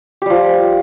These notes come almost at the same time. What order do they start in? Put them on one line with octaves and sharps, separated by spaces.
G4 G3 F3